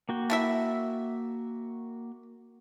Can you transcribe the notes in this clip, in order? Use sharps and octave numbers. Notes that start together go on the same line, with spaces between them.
A#3 F#4 G5
A3 E4 E5